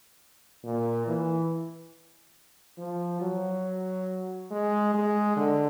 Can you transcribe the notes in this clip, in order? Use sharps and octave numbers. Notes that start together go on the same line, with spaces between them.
A#2
E3
F3
F#3
G#3
G#3
D3